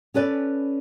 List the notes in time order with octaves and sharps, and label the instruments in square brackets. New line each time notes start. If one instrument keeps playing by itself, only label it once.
[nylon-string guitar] C#4 A4 B4 D5